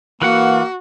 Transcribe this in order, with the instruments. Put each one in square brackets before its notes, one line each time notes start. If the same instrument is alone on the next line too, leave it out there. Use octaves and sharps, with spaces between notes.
[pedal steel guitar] E3 B4 F#5 [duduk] A#3 [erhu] F#4